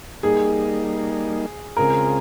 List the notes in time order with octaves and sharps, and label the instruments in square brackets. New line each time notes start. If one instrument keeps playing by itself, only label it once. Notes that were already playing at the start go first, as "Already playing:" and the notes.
[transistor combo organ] G3 A#3 D#4 [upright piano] G#4
[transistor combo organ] C#3 G#3 C4 F4 G#4 [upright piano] A#4